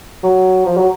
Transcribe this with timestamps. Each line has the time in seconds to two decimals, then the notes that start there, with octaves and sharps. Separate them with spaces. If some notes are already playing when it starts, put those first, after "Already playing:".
0.23 F#3
0.65 F3
0.77 F#3